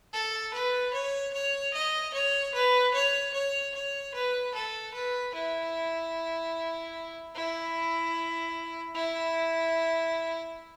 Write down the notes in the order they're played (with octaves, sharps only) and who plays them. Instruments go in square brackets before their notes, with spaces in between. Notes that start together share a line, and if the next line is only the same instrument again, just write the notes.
[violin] A4
B4
C#5
C#5
D#5
C#5
B4
C#5
C#5
C#5
B4
A4
B4
E4
E4
E4